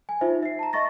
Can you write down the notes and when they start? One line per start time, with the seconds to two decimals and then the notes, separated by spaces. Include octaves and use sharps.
0.09 G#5
0.21 D#4 F4 C5 E5
0.43 E5 C7
0.59 A5 A#5
0.73 D#5 E5 A5 C#6 A6 A#6